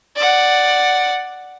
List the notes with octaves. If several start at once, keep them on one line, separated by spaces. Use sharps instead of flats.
D5 F#5